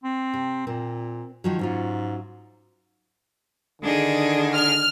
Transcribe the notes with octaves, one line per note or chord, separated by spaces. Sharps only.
C4
C3
A#2 C4 A#4
D#3 F3 F#3
G#2 F#3 C#4 F4
D3 D#3 D4 G#4
F6